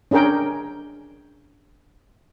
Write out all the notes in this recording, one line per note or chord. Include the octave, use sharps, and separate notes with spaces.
C#4 D4 G#4 A#4 G5